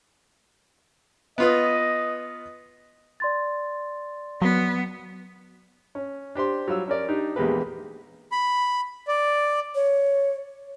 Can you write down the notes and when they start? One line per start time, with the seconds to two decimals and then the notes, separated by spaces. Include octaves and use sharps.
1.38 B3 F4 B4 D#5
3.20 D5 C6 A6
4.42 F#3 B3
5.95 C#4
6.35 D4 G4 C5 C6
6.68 F#3 G3 F4 E6
6.88 C#4 A#4 D5
7.08 D4 D#4 G4
7.36 A#1 E2 G#3 G4 B4
8.31 B5
9.08 D5
9.75 C#5